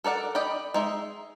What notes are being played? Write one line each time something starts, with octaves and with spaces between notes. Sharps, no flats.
A4 A#4 D5 F#5
D5 D#5 G5 B5
G#3 D#4 E5